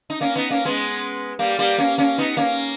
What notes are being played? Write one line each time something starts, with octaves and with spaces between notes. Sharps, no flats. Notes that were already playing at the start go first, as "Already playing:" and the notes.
D#4
A#3 C#4
B3 D#4
A#3 C#4
G#3 B3
G3 A#3
G3 A#3
A#3 C#4
A#3 C#4
B3 D#4
A#3 C#4